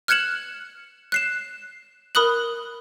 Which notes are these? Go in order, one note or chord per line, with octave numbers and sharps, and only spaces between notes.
F6 F#6 G#6 C#7 E7 F#7
F#6 C7 E7
A#4 B5 D#6 F#6 F#7